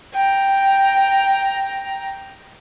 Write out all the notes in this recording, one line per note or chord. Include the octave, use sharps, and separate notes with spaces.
G5 A#5